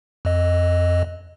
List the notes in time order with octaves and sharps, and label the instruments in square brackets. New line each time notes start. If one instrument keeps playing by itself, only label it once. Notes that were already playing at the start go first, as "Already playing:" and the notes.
[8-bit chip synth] F2 D#5